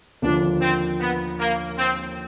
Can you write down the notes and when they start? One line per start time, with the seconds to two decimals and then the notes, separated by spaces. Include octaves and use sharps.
0.22 D#2 D3 F3 A#3 D4
0.61 C4
1.00 B3
1.39 A#3
1.77 C4